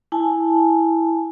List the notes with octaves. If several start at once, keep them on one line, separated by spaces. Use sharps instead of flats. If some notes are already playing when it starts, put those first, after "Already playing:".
E4 G#5 A5